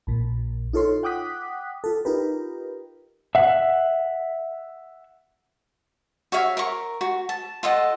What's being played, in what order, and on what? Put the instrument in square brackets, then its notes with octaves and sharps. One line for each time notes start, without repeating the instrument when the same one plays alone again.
[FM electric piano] A#1 A#2
D#4 F4 A4 C#5 C6
F#5 G5 D6 D#6 F#6 B6
F4 A4
D#4 F4 G4 A#4 B4
[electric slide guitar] E5 F#5
[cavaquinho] F#4 C#5 E5 F5
A#4 C#6
F#4
A5
F4 A4 D#5 F#5